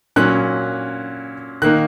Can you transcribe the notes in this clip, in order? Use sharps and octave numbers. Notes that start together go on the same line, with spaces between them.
A#2 F#3 C#4 F#6
D#3 A#3 D#4 F#6